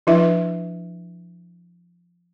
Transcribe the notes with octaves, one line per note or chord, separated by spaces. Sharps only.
F3 D4 E4 B4 E5